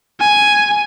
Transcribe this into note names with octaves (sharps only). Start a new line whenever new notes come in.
G#5